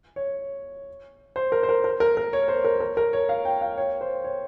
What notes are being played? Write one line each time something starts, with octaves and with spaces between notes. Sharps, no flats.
C#5
C5
A#4
C5
A#4
A#4
A#4
A#4
C#5
C5
A#4
A#4
A#4
C#5
F5
G5
F5
C#5
C5
C#5